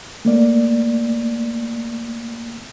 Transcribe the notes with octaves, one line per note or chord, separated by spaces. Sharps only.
A3 A#3 D5